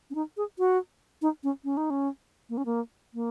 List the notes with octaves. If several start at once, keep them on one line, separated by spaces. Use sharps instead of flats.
C#4
D#4
G#4
F#4
D#4
C#4
C#4
D#4
C#4
A#3
C#4
A#3
A#3